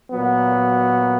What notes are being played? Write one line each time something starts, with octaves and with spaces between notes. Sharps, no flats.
A#2 F#3 B3